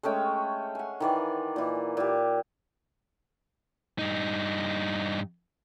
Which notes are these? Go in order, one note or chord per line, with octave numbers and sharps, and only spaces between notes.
G#3 A3 C#4 G5
F#5 G#5
D#3 E3 D5
A#2 E3
A#2 G4
G2 D#4